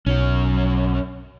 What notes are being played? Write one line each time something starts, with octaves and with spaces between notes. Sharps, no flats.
B1 F#3 C#4